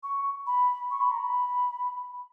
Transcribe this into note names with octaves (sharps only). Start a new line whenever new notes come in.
C#6
B5
C#6
B5
A#5
B5